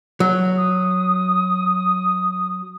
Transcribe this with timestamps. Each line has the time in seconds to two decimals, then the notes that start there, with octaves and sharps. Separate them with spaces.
0.20 F#3
0.57 D#6